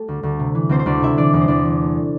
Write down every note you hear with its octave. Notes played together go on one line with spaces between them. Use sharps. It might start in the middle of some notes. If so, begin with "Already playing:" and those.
Already playing: A3 G4 A4
D2
D2
C3
E3
D2 C4 C5
C5
D2 D4 D5
C3 E4 E5
E3 D4 D5
E2 D5
C5
E2 D4 D5
E3
A3